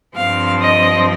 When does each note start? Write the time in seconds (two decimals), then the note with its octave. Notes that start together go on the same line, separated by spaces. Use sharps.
0.16 G2 F3 C4 F5
0.62 D#5